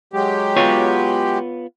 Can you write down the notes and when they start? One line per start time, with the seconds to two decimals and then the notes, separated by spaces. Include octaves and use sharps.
0.13 F#3 G#3 G4
0.56 B3 F4 C#5